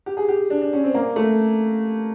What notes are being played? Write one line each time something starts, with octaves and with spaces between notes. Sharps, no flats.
G4
G#4
G4
D4
D4
C#4
C4
A#3
A3